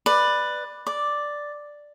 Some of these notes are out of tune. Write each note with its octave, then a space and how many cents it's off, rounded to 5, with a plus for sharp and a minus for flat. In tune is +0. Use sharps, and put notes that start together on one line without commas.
B4 +0 D5 +15
D5 +0 D6 +0